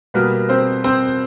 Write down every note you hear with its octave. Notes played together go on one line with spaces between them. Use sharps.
B2 G3 A#3 B3 A#4
C4 C5
C4 C5